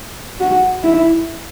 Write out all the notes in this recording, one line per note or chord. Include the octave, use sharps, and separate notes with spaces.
F#4
E4